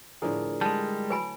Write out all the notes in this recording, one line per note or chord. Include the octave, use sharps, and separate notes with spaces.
A2 D3 F3 G#4 A#4
G3 G#3 A5
F#3 B4 G#5 B5